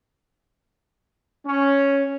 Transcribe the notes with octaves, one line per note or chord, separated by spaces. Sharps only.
C#4